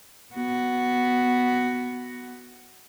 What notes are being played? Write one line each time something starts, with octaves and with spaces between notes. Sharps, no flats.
B3 F#4